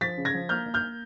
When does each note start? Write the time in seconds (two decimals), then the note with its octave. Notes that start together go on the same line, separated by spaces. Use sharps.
0.01 F3 A6 B6
0.18 C#3
0.25 G#6 A#6
0.34 F3
0.49 A#3 F6 G6
0.66 A#3
0.74 F6 G6
0.83 A#3